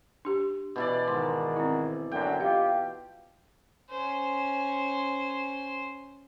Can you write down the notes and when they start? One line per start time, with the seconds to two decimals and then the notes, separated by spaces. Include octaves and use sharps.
0.25 D4 G4
0.76 B2 E3 D5
1.08 G#2 D#3 C6
1.56 C4 E4
2.11 F#2 D3 G5
2.41 F4 G4 D#5
3.90 C#4 C5